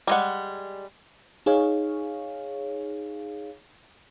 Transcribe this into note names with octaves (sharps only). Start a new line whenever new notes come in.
G3 G#3 F#5
D#4 G#4 C#5 F5